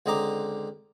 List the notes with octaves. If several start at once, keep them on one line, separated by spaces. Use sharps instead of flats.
C#2 D3 C4 D#5 A#5 D6